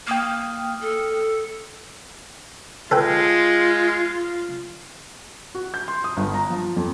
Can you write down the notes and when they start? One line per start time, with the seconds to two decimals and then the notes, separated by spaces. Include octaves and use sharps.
0.07 A#3 G5 D#6 F6
0.81 A4
2.91 G#3 F4 A4 B4 G5
5.55 F#4
5.74 G6
5.88 C6
6.04 D#6
6.17 G1
6.34 A#5
6.50 F3
6.76 F2